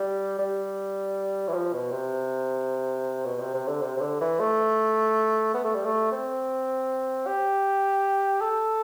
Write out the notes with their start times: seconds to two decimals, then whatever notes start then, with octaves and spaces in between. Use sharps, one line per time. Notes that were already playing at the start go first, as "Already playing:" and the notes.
Already playing: G3
0.39 G3
1.48 E3
1.54 F3
1.73 B2
1.91 C3
3.25 B2
3.40 C3
3.54 C3
3.68 D3
3.82 C3
3.97 C3
4.01 D3
4.21 E3
4.40 A3
5.54 B3
5.64 A3
5.75 G3
5.86 A3
6.12 C4
7.26 G4
8.41 A4